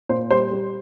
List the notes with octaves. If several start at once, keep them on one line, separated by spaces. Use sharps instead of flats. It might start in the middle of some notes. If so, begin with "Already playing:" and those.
A#2 C5
G3 C5
G3